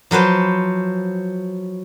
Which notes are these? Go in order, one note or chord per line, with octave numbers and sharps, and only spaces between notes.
F3 F#3 B4 C5